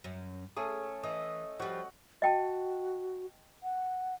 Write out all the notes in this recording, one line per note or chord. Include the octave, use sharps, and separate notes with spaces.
F#2 C#4
A3 C#4 G#4 D#6
E3 D#5
F3 G3 F#4
F#4 D#5 G5 A5
F#5